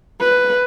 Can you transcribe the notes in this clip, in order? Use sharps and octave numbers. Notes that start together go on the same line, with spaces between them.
B4